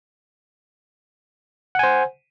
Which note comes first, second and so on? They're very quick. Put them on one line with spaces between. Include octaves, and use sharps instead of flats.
F#5 G#5 C5